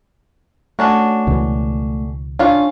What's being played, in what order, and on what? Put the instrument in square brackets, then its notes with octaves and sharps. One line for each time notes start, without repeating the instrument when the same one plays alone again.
[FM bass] A3 [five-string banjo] C#4 D4 F#4
[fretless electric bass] C#2 B2 E3
[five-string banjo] C#4 F4 [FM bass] D4